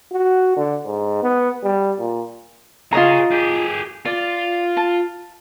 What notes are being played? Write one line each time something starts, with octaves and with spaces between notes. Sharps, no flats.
F#4
D3
G#2
B3
G3
A#2
F4 G#4 C#5 D#5 A#5
G4 G#4
F4 D5
A5